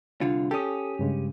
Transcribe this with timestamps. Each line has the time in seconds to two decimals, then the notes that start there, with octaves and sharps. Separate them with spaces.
0.21 C2 D3 F4
0.51 C#4 G4 A4 D#6
0.99 G2 C#3 G#3